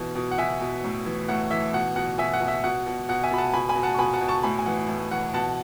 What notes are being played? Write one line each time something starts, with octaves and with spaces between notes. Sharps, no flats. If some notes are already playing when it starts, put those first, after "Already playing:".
Already playing: B2 E3
B2
F#5
B2 E5 G#5
B2
A2
E3
A2 F#5
E3 E5
B2 F#5
B2 F#5
B2 E5 G#5
F#5
B2
E5
B2 F#5
B2
B2 F#5
E5 G#5
B2 B5
F#5 A5
B2 G#5 B5
G#5 B5
B2
F#5 A5
C#6
B2 G#5 B5
F#5 A5
B2
A5 C#6
A2 G#5 B5
G#5
E3 F#5
A2
E3 F#5
B2 F#5 A5